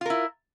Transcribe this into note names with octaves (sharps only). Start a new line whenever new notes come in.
E4 F4 A#4